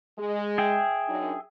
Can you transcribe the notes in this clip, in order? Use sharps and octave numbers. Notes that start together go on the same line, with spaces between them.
G#3
G#4 E5 G5
F#2 D4 D#4